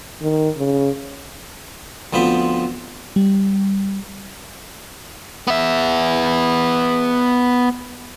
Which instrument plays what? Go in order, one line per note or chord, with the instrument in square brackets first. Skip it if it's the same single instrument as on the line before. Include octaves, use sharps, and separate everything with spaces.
[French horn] D#3
C#3
[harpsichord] D2 F3 B3 C4 B5
[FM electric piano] G3
[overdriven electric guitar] B3 E5